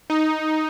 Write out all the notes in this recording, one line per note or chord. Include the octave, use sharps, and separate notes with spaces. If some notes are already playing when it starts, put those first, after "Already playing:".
D#4